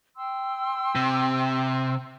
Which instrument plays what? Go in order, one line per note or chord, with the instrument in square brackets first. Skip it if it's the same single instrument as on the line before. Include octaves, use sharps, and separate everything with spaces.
[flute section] G5 C6 E6
[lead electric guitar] C3